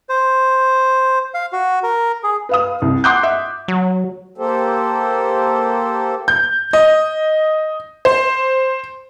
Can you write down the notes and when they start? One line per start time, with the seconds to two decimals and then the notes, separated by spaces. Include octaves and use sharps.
0.09 C5
1.34 F5
1.53 F#4
1.83 A#4
2.24 G#4
2.49 B4 F5 D#6
2.82 C2
3.04 F#5 C6 D6 D#6 F#6 G6
3.23 E5
3.68 F#3
4.38 A#3 G4 A4 C5
6.28 G6
6.73 D#5
8.05 C5